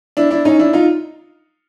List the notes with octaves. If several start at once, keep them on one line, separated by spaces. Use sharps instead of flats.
D4 E4
D4 E4
C#4 D#4
D4 E4
D#4 F4